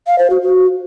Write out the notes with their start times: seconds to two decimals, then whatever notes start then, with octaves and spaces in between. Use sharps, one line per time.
0.07 F5
0.19 C5
0.30 F#4
0.42 F#4